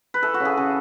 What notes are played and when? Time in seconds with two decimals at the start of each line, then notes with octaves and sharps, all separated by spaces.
0.14 B4
0.22 E3 A4
0.34 F#4
0.40 C#3
0.45 G#4
0.57 C#3 A4